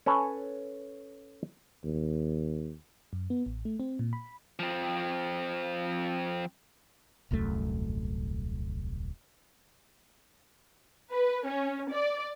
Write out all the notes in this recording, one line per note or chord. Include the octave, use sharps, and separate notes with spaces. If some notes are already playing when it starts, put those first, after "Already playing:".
C#4 A4 B4 C#5
D#2
F#2
B3
A1
A3
C4
A#2
B5
F3 C4
D#1 C2 F#2 A3
B4
C#4
D5